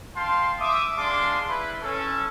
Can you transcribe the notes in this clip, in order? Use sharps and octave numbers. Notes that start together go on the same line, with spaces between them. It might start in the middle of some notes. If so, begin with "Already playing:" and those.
F5 G5 A5 C6
E5 D6 D#6
G#3 D4 F5 A5 C6 D6
E4 B4
C#4 A4